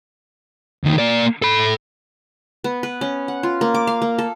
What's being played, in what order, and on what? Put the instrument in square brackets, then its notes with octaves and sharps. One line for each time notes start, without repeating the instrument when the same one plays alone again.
[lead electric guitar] D2 D#3
A#3 D5
A4 B5
[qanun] B3
B4
C#4
F#5
F4
A#3
D6
F5
A#3
A4